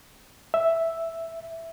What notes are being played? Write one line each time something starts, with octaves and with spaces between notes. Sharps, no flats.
E5